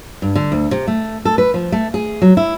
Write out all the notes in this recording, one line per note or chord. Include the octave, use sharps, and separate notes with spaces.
G2
D3
D2
C3
A3
A4
B4
F3
A3
G#4
F#3
E4